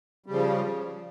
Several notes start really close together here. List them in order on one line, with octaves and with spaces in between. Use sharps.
G3 C#3 F3